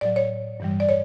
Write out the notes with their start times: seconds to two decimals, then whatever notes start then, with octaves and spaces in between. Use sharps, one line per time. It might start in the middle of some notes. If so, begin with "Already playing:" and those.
0.01 A2 F#3 D5
0.16 C#5
0.60 G2 E3 G3
0.80 D5
0.89 C#5